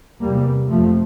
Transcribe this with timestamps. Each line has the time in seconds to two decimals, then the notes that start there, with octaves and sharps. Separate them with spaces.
0.20 E2 C3 G3 A#3
0.68 F2 C3 F3 A3